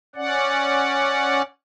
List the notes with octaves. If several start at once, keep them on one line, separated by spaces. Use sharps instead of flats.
C#4 D5 F#5